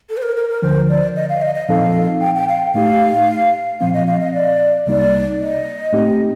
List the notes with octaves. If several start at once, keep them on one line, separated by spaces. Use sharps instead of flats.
A4
C5
A#4
A#4
A#4
D2 D3 F3 C5
D5
D#5
F5
D#5
D#5
A#2 F3 C4 D#4 A4 F5
G5
G5
F5
A2 A3 D#4 G4 F5
A#2 F3 C4 F5
D#5
F5
D#5
D5
C2 C3 G3 A#3 D#4 D5
D#5
A2 A3 C4 D#4 G4